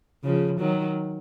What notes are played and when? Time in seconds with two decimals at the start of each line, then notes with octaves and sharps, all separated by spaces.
0.24 C#3 F3
0.60 D#3 F#3